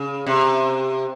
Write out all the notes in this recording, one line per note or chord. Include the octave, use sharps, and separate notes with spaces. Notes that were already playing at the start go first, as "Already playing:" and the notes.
Already playing: C#3
C3